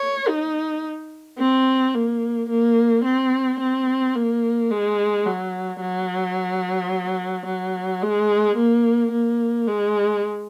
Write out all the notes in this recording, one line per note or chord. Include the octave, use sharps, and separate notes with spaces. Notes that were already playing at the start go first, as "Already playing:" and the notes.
Already playing: C#5
D#4
C4
A#3
A#3
C4
C4
A#3
G#3
F#3
F#3
F#3
G#3
A#3
A#3
G#3